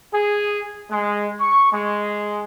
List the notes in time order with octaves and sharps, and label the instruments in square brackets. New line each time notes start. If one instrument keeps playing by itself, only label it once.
[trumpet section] G#4
G#3
C#6
G#3